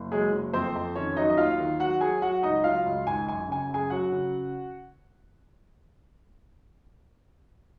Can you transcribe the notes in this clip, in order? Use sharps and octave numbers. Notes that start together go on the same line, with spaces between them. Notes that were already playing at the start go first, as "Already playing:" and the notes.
Already playing: F#1
F#3 G#3 G#4
F#1
F2 C4 C5
F2
D#3 C#4 C#5
F#3 D#4 D#5
D#5
D#2 F4 F5
D#3
F#3 F#4 F#5
F#3 G#4 G#5
F#3 F#4 F#5
C#2 D#4 D#5
F#3 F4 F5
C#2
G#1 G#5
F#2 G#5
C#3 G#5
F#2 G#4 G#5
F#3 F#4 F#5
C#3